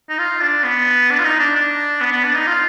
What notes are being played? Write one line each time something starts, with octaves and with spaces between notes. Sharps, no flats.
D#4
F4
D4
B3
D4
F4
D#4
D4
D4
B3
B3
D4
D#4
F4